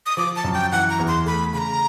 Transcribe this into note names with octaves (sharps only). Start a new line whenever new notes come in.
D#6
F3 D6
A5
F#2
G5
E3 F#5
A#5
E2
C6
A3 B5
C#3 B5
A#5